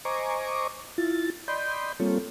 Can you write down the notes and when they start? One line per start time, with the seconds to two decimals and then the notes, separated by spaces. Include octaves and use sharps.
0.05 C5 D#5 G#5 A#5 C#6 D6
0.98 E4 F4 A6
1.48 D5 D#5 B5 C6 G6
2.00 G3 A#3 C4 F4 A4 C#5